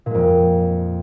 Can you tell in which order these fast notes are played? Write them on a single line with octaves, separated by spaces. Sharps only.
A#2 G#3 F2